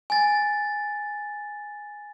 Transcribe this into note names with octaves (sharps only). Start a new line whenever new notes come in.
G#5 A6